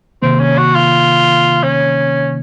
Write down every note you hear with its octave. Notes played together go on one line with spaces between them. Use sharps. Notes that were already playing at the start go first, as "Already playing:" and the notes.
C3 D#3 A#3 C4
C#4
F#4
F4
C#4